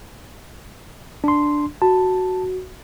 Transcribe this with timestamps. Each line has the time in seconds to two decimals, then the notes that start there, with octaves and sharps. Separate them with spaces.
1.24 D4 C6
1.82 F#4 A5